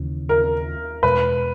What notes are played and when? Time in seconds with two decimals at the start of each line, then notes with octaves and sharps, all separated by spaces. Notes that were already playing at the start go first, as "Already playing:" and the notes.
Already playing: D#2 C#3 E3
0.29 A#4
1.03 E2 B2 G#3 B4